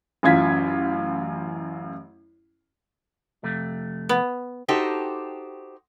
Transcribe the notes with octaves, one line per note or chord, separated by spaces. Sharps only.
A1 F#2 F4 G#6 B6
F2 C3 A3
B3
D#4 F#4 G4 A4 C5